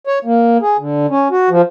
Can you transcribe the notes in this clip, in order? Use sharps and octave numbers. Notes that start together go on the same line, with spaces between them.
C#5
A#3
G#4
D3
C#4
F#4
F3